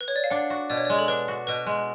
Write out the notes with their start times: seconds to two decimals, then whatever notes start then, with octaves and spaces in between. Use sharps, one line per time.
0.01 B4
0.08 C#5
0.16 D5
0.24 F5
0.30 D4 F#5
0.50 F#4
0.70 B2 D5
0.77 C#5
0.85 G#3 D5
0.99 A4
1.08 D4 B4
1.28 F#4
1.47 B2 B4
1.66 G#3